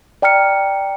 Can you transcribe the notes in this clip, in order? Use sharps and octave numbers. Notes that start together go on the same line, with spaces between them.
D5 G5 A#5 F6 C#7